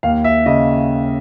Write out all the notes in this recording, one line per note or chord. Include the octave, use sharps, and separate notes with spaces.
D#2 F5
E5
C#3 D#5